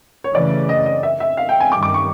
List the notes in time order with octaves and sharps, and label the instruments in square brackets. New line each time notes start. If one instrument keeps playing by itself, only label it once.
[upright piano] C#5
[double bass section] F#2 C#3 E3 A3 C#4 [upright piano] D5
[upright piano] D#5
D#5
E5
E5
F5
G5
G#5
[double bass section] G2 D#3 G3 [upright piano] D6
[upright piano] D6
C#6